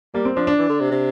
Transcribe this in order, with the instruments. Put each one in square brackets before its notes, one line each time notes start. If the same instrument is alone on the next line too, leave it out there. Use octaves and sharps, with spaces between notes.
[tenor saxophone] G3 [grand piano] A#3
[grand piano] C4
[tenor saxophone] F3 [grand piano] D4
[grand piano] D4
[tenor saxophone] E3
D3
C3
C3